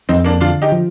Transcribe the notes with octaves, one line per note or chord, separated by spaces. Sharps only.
F2 C4 D#4
A#3 D4
D3 D4 F4
D#4 G4
F3